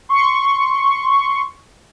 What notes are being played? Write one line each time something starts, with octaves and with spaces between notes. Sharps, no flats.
C6 C#6